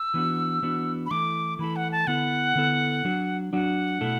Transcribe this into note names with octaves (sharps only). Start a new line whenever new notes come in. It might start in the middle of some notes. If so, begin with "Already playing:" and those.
Already playing: E6
E3 B3 D4 F#4
E3 B3 D4 F#4
B5
E3 A3 E4 A4 D6
E3 A3 E4 A4 B5
F#5
A5
D3 B3 E4 A4 F#5
D3 B3 E4 A4
F#3 D4 F#4
F#3 D4 F#4 F#5
B2 A3 E4 A4